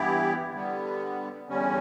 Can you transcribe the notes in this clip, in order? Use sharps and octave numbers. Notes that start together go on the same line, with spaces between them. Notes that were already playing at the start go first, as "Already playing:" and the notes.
Already playing: G2 E3 B3 E4 G4
D3 G3 B3
E2 D3 G3 C#4